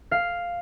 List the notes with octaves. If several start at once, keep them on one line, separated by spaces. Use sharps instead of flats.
F5